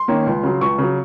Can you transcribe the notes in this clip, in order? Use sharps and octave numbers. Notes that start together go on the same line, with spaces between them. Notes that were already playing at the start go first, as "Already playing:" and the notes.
Already playing: C6
D#3 A#3 C#4
C#2
C#3 F#3
C#2 C#6
C#3 F#3